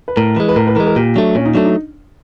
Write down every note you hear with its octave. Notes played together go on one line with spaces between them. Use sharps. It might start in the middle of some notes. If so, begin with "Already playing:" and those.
B4
A2 A#4
E3 G#3 B4
B4
A2 A#4
B4
E3 G#3 A#4
A#4
A#2 G4
F#3 A3 D4
A#2 C#4
D#4
F#3 A3 D4
D#4